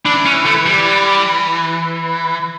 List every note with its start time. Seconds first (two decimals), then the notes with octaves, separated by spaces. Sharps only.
0.05 E3 D4
0.25 C#4
0.45 A3
0.66 G3